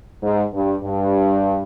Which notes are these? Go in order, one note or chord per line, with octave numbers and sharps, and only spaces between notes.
G#2
G2
G2